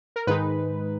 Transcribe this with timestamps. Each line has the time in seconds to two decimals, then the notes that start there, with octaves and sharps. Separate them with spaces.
0.16 A#4
0.27 G#2 D#3 G#3 D#4 B4